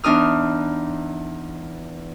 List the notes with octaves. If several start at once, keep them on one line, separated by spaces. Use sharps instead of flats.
E2 E3 D4 D#4 D#6 F6